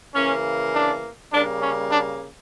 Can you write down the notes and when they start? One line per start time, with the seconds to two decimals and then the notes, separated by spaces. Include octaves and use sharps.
0.15 C#3 E3 A#3 C#4
0.74 D4
1.33 C#3 G3 A#3 D4
1.62 C#4
1.92 D4